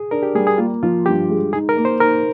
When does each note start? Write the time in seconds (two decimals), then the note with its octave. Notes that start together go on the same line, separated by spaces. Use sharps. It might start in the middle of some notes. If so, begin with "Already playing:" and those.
Already playing: G#4
0.11 D4 A#4
0.23 G4
0.35 G3 G#4
0.47 G#4
0.58 A#3 F4
0.83 F3 F4
1.06 G2 G4
1.29 G#3
1.53 D#4 G#4
1.69 A#4
1.77 A#3
1.85 C5
2.00 D#4 A#4